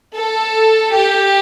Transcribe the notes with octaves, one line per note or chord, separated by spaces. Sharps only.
A4
G4